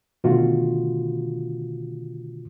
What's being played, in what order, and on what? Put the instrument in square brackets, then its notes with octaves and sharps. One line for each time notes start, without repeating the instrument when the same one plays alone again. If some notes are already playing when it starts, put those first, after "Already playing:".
[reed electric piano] B2 D3 D#3 A3 F4 F#4